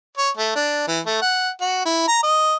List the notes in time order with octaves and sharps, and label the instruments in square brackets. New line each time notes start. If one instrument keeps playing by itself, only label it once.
[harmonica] C#5
A3
D4
E3
A3
F#5
F#4
E4
A#5
D#5